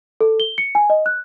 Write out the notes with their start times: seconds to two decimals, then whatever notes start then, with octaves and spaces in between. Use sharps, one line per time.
0.21 A4
0.40 G7
0.58 C#7
0.75 G#5
0.90 D#5
1.06 F#6